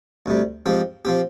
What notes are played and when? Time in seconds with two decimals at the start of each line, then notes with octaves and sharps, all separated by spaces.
0.26 D2 C3 G3
0.66 G#2 F3 C4 G4
1.05 F3 C4 G4